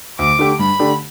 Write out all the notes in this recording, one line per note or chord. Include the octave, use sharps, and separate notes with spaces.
D2 D6
D3 A3 G4
G2 B5
D3 A3 D4 G4